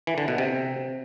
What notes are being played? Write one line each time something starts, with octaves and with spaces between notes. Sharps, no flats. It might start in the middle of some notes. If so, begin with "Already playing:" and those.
E3
D3
B2
C3